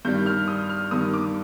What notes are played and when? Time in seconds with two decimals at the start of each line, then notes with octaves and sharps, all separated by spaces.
0.05 G2 D#3 G3 G6
0.26 F6
0.48 D#6
0.70 F6
0.91 G2 D#3 G3 D#6
1.14 D6